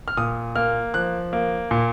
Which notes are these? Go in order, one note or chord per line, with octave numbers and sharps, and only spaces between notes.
F6
A#2 D#6
A#3 F6
F3 F#6
A#3
A#2